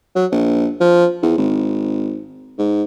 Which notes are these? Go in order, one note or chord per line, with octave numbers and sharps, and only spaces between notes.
F#3
A#1
F3
E2
G#1
G#2